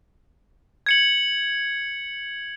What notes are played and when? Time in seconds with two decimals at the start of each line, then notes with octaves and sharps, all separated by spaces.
0.86 G#6 C#7 F#7